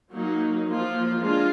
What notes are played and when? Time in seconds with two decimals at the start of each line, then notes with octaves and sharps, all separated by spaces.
0.12 F#3 A#3 D#4
0.67 F3 A#3 F4
1.22 G#3 D4 F4